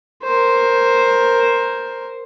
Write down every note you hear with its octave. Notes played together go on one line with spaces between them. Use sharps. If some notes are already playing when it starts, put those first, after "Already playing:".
A#4 C5